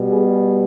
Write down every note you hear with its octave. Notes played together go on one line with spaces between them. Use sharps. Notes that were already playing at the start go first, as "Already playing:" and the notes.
Already playing: B2 G3
G#4